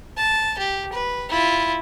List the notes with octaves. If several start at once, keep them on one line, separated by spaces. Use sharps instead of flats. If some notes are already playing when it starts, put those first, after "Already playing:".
A5
G4
B4
E4 F4